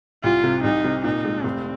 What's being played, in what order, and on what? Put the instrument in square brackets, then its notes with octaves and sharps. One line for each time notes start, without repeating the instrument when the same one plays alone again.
[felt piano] C2 [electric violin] F4
[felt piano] C3
[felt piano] C2 [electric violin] D#4
[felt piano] C3
[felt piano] A#2 [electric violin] D#4
[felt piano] G#3
[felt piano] F1 [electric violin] C4